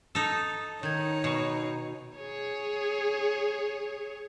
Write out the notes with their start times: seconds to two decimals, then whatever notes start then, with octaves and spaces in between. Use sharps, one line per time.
0.15 D#4 A4 A5 D#6 E6
0.83 D#3 D#4 C#5 G6 G#6
1.24 B2 C#6 C7 C#7
2.17 G#4 C#5